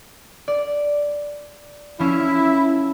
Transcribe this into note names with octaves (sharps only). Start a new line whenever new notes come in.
D5
F3 C#4 E4